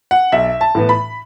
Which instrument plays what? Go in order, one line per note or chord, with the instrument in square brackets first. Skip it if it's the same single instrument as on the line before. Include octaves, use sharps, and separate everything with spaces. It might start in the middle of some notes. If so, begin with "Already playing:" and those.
[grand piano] F#5
B1 E5
A5
A2 E3 B3
B5